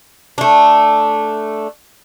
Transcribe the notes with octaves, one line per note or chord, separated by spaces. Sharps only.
A3 D4